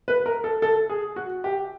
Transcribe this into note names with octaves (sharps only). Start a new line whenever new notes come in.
B4
A#4
A4
A4
G#4
F#4
G4